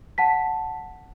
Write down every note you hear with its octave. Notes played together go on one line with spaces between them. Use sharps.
F#5 A5 B6